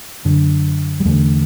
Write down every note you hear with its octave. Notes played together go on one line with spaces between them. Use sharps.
F#2 D3
G3
E2 D3 A3